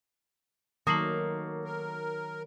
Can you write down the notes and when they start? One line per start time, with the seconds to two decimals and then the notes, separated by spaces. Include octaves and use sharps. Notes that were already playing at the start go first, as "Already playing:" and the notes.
0.87 D#3 F#3 A3 A#3 D#6 C7 F#7
1.65 A#4